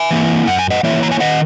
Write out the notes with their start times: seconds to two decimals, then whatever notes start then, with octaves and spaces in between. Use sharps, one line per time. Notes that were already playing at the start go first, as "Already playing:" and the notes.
Already playing: E5 G#5
0.11 E3 A#3 E4
0.47 F#2 F#5
0.59 G#5
0.70 D#5 F#5
0.83 E3 A#3 E4 C#5 E5
1.03 A#5
1.12 G#5
1.20 D#3 D#5 F#5